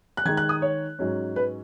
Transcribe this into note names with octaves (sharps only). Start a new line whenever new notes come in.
F#6
D#3 G#3 D#4 G#6
F#6
D#6
C#5
G#2 F#3 C#4
B4